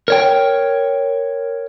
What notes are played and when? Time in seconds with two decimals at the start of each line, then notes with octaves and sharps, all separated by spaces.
0.08 A#4 C#5 G5